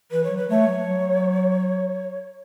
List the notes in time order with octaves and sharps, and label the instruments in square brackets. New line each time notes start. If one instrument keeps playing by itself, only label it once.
[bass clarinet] E3 [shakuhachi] B4
[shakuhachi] C#5
[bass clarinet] F#3
[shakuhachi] B4
[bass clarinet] A3 [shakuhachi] C#5
[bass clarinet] F#3
F#3